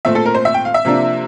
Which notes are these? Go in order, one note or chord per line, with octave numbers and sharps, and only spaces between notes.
A#2 A3 C4 E5
A4
A#4
C5
E5
G5
F5
E5
C3 F3 A#3 D4